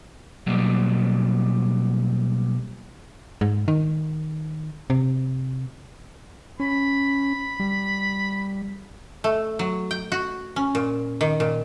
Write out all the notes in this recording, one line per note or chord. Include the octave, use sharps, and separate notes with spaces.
B2 F#3 G3 A#3
G#2
D#3
C3
C#4 B5
G3
A3
F#3
G5
F#4
C#4
A#2
D#3
A#2